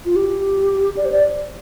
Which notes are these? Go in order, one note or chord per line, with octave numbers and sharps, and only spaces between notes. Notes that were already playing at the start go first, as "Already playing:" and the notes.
F4
G4
D5
C5
D5